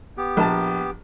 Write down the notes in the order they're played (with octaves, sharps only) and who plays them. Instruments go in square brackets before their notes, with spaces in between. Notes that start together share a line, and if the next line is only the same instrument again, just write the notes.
[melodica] B3 G4
[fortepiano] A#1 A5